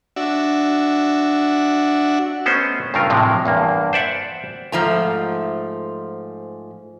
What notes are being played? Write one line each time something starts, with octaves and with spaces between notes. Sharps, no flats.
D4 F#4 E5
A3 B3 C#4 C5 D#5
G2 C#3 A3 F4 A#4
A2 C3 F3 F#3 G#3
E2 G2 A#3
C5 D5 E5 F#5
G#2 F3 A3 A#5